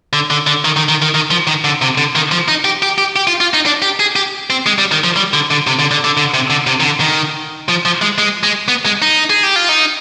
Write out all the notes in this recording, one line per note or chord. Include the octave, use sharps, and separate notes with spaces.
D3
D3
D3
D#3
D#3
D#3
D#3
D#3
F3
D#3
D3
C3
D3
D#3
F3
D#4
G4
G4
G4
G4
F4
F4
D#4
D4
G4
G#4
G4
C4
G#3
G3
D#3
F3
G3
D3
D3
C3
D3
D3
D3
D3
C3
D3
C3
D#3
D3
D#3
F3
F3
G#3
G#3
G#3
B3
G#3
D#4
G#4
G4
F4
D#4